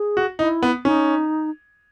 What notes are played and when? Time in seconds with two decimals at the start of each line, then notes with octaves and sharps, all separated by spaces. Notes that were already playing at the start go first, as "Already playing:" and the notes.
Already playing: G#4
0.17 F#4
0.39 D#4 E4
0.63 B3
0.85 C#4 D#4